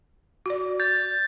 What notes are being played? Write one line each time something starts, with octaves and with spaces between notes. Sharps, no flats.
F#4 D5
G6 A6